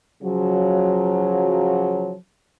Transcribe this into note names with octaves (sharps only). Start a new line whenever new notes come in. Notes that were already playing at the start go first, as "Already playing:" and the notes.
C#3 F3 F#3